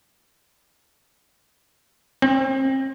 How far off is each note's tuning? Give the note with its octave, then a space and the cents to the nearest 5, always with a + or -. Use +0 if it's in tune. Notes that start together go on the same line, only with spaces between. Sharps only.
C4 +35